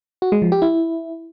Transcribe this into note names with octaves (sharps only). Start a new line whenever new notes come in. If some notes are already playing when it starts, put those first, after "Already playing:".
F#4
G#3
F3
G4
E4